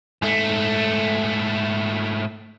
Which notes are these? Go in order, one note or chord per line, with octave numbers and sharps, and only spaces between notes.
G#2 A3